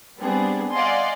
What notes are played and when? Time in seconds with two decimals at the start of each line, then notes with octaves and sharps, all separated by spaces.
0.18 G3 B3 C4 D4 G#4
0.72 D5 D#5 F5 F#5 G#5 C6